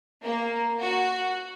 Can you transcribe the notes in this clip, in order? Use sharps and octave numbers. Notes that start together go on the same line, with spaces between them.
A#3
F#4